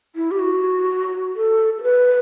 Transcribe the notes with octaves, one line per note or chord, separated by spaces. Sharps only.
E4
G4
F#4
A4
A4
B4